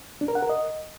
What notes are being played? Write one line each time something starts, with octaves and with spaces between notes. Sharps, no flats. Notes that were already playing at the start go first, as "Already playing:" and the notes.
D4
A#4
F#5
A#4
D#5